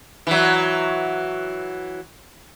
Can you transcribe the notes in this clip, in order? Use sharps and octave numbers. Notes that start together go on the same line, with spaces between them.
E3 F#3